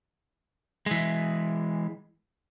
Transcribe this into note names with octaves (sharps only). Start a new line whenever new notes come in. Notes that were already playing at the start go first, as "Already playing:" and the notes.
E3 G#3